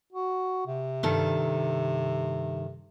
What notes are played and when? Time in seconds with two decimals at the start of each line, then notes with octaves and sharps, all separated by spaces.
0.13 F#4
0.67 C3
1.03 G2 D#3 A4